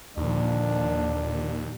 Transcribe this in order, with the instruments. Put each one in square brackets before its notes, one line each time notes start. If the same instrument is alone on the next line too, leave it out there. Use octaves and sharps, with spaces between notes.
[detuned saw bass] D#2 [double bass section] A#2 D3 F3 [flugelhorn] D4